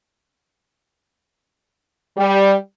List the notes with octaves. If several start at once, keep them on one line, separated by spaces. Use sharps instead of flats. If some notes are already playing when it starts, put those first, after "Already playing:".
G3